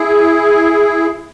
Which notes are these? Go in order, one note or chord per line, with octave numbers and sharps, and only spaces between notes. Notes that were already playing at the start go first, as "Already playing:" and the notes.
Already playing: E4 G#4